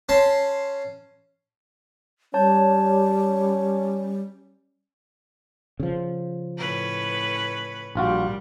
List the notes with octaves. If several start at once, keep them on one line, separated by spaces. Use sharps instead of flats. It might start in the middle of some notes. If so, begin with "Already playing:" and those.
C#4 A5 C6
G3 C#4 C#5 A5 G6
C#3 F3
A2 C#4 B4
A#1 A#2 G3 F4 F#4